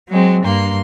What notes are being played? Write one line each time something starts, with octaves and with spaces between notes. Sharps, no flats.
F#3 G#3 C4
G2 A#3 C6